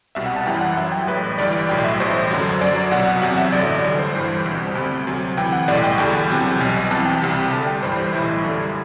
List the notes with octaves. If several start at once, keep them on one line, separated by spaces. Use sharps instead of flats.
C2 B2 G3 E5
F#5
A5
F#2 E3 G3 G5
F#5
F#2 F#3 E5
G5
A1 A2 G3 B4
G1 G2 E3 G3 D5
B1 A2 F#3 G5
E5
A1 A2 G3 C5
F#2 D3 F#3
F#2 F#3 D5
C2 B2 F#3 F#5
E2 C3 F#3 F#5
E5
A1 G2 D3 F#3 D5
D2 D3 G3
C5
G1 G2 E3 G3 C5
C2 B2 G3
D2 C3 G3
D2 C3 F#3
D2 C3 E3 G5
F#5
B1 A2 G3 D5
G5
E2 D3 G3 G5
E2 C3 F#3
B1 B2 G3
C2 C3 E3 A5
G5
C2 C3 G3
D2 D3 G3 A5
G5
G1 G2 E3 G3 C5
C5
B1 A2 E3 G3 E4
F#2 D3 G3